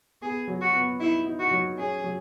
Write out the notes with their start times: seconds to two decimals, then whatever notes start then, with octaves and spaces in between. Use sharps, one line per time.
0.22 B3 G#4
0.48 F#3
0.61 F#4
0.74 B3
0.99 D#4 E4
1.26 D#4
1.39 F#4
1.51 F#3
1.78 C#4 G#4
2.04 F#3